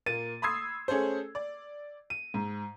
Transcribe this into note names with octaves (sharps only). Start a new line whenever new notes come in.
A#2 A#3 A6 D#7
B5 C6 D#6 E6 G#6 C7
A3 C#4 G#4 A4 C5
D5
D#7
G#2